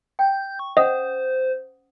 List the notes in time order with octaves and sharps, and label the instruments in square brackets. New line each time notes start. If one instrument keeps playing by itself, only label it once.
[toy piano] G5 [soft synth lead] G6
[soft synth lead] C#6
[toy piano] C#4 F#5 D#6 [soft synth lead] C5 [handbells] D#5